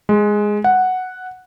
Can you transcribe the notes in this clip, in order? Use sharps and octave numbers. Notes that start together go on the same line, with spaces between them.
G#3
F#5